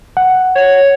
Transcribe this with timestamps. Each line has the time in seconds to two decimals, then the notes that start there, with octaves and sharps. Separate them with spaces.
0.17 F#5
0.55 C#5